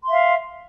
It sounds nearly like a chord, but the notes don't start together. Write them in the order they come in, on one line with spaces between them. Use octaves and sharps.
C6 E5 F5